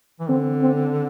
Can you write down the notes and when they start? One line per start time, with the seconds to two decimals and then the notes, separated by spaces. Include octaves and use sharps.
0.20 E3
0.29 D3 C4
0.61 C4